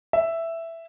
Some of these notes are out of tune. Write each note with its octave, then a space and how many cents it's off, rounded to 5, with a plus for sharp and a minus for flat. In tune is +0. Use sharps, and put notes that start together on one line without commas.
E5 +5